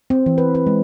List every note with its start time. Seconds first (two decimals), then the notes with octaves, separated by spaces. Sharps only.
0.10 C4
0.26 E3
0.38 B4
0.55 B4
0.67 G#3